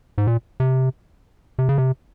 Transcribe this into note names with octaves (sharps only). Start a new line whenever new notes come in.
G#2
A#2
C3
C3
C#3
C3